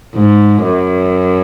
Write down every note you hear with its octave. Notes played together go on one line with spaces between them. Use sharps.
G#2
F#2